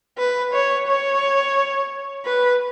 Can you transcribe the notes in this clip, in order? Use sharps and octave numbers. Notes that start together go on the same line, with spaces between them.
B4
C#5
C#5
B4